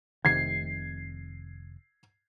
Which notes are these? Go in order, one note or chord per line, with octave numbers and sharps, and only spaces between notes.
F1 C3 D#3 G#6 C7